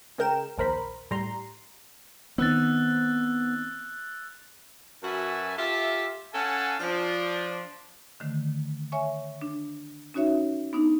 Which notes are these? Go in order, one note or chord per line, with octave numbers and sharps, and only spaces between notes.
C#3 G#3 A#4 G5 E7
A#1 D#2 A#4 C5 B5
A2 G3 A#5 C6
D#3 B3 C4 E6 F#6 A6
F#2 F#4 B4 E5 G#5 A5
F4 G4 A4 E5
C#4 A4 F5 F#5 G#5 A5
F3 D4
D3 D#3 A3
C#5 E5 G#5 C#6
D4
C#4 D#4 F#4 C#5 E5
B3 D4 D#4